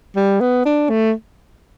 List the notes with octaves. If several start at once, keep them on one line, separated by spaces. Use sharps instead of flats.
G3
B3
D4
A3